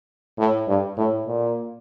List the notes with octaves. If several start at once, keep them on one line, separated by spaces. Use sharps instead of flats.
A2
G2
A2
A#2